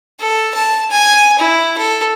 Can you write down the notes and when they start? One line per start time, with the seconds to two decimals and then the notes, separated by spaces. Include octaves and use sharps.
0.20 A4
0.55 A5
0.90 G#5
1.38 E4
1.78 A4